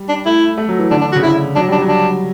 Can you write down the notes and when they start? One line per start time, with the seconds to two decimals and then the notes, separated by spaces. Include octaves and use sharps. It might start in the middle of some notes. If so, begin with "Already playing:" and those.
Already playing: G3
0.09 D4
0.26 A3 E4
0.58 A3
0.69 F#3
0.79 E3
0.91 D3 D4
1.01 D4
1.12 F#4
1.16 C#3
1.23 D3 E4
1.56 F#3 D4
1.68 G3 D4
1.81 F#3
1.88 D4